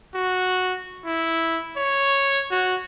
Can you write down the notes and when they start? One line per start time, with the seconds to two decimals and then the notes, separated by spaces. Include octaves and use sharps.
0.15 F#4
1.06 E4
1.77 C#5
2.51 F#4